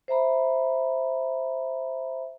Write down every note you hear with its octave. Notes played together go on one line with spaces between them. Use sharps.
C5 E5 A#5 B5